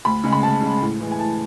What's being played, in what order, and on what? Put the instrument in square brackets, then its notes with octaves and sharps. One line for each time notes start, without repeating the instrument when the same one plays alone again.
[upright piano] D2 B5
C#3 G#3
B5
D2 A5
C#3 G#3
A2
E3 G#3
G#5
A2 A5